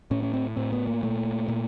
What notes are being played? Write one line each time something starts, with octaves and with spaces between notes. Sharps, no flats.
A2 C#4
C#4
C4
A2 C4
B3
A#3
A#2 A3
A#2